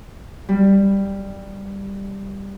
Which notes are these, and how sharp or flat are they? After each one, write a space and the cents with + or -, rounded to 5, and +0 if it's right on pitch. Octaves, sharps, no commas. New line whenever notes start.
G3 +5